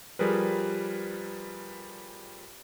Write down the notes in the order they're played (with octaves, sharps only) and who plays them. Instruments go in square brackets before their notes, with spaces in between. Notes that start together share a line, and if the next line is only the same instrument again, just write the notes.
[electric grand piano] F3 G3 G#4 A#4 B4